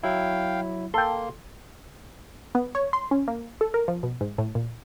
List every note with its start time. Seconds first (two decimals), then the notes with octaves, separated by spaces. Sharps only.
0.03 F#3 E4 F5 G5
0.94 A#3 A4 G5 C6
2.55 B3
2.75 C#5
2.93 C6
3.11 C#4
3.28 A#3
3.61 A4
3.74 A#4
3.88 F3
4.03 B2
4.21 G#2
4.38 A2
4.55 A#2